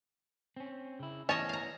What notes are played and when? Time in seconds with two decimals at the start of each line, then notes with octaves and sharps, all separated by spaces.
0.56 C4 C#4
1.00 C#3 E4
1.29 E3 B3 C#4 C#5 D#5 A5
1.49 F5 A#5